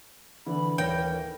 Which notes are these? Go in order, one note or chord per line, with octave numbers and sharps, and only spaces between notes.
D3 E3 B5
D#1 A#4 C#5 G5 A#6